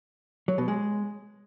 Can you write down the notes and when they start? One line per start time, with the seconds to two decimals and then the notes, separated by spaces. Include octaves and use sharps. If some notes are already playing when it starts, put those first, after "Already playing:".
0.48 F#3
0.58 B2
0.68 G#3